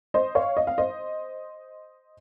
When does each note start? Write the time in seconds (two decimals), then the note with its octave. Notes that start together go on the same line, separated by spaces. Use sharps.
0.14 C5 D#5
0.35 C#5 F5
0.57 D#5
0.67 F5
0.78 C5 D#5